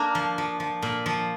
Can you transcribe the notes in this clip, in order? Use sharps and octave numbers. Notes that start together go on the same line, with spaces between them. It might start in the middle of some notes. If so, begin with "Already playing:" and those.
Already playing: A#3 D4
F3
F3
F3
A#2
F3